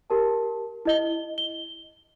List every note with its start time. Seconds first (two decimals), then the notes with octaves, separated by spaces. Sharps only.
0.10 G4 A#4 A5
0.85 E4 D#5 G7
1.38 G7